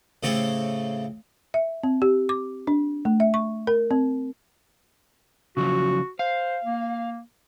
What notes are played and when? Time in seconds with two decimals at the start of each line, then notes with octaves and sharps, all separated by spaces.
0.23 A2 C#3 C4 G4 A4 C#5
1.54 E5
1.83 C4
2.02 G4
2.29 D6
2.67 D4
3.05 A3
3.20 E5
3.34 C#6
3.67 A#4
3.91 C4
5.57 C#3 F3 F#3 F#4
6.19 C5 F5
6.64 A#3